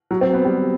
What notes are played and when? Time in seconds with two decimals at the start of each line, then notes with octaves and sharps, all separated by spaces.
0.11 F#3
0.21 C4
0.33 B3
0.45 G3